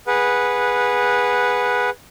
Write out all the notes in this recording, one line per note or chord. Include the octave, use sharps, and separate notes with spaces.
G#4 B4 F#5